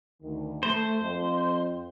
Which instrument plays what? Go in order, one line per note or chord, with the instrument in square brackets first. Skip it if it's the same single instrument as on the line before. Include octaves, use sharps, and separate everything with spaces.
[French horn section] D2 D#3
[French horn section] A3 [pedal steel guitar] C5
[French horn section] F2